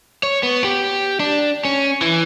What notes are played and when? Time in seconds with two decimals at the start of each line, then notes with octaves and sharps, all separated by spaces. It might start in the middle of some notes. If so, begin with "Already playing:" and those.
0.23 C#5
0.43 B3
0.64 G4
1.20 D4
1.65 C#4
2.02 E3